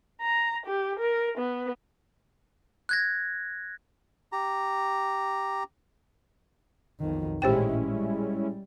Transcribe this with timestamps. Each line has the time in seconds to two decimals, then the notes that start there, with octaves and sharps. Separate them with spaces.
0.21 A#5
0.66 G4
0.99 A#4
1.37 B3
2.89 F#6 G#6 A#6
4.32 G4 A#5
7.00 B1 F2 D#3
7.42 A1 A#2 G#3 C#4 E4 G4 C5 G5
7.87 G3